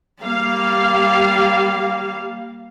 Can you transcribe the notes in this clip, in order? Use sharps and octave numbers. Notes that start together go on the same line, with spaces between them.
G3 A#3 F5